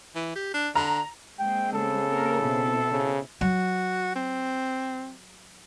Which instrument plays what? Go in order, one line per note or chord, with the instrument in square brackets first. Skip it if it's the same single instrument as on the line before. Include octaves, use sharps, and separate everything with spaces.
[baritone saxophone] E3
G4
D4
[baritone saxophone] D3 [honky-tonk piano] A#5
[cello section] G#3 A#3 C4 [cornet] G5
[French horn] C#3 [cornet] A4
[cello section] A#3 C4 A#4
B2 C4 E4
[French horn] C#3
[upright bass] F#3 [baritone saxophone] F#4
[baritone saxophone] C4